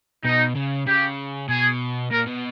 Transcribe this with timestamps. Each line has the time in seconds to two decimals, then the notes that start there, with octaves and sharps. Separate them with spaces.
0.25 B2 D#4
0.55 C#3
0.86 C#3 G4
1.49 B2 G#4
2.11 A#2 A#4
2.27 B2